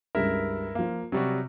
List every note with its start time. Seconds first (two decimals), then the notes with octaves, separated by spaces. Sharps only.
0.15 C#2 G2 E4 A#4 E5
0.75 F3 A#3 F5
1.12 C3 F#3 G3 F#4